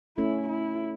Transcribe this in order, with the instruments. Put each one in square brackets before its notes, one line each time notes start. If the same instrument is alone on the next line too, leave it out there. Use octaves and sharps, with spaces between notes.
[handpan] A3 C#4 [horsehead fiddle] E4
[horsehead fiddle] E4